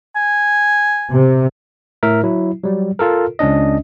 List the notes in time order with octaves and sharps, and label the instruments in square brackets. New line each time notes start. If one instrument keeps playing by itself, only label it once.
[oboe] G#5
[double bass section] C3
[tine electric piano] A2 A#4 E5
F#3 E4
F#3 G3
F4 A4 A#4
C#2 C#4 D4 D#5